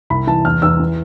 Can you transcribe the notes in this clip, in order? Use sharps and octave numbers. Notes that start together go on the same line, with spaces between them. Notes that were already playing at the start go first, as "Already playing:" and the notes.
C2 B5
E3 A5
E2 F6
E2 E6
E3